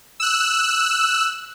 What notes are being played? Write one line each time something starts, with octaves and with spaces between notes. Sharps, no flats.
E6 F#6